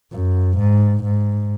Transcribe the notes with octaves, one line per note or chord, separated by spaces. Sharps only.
F#2
G#2
G#2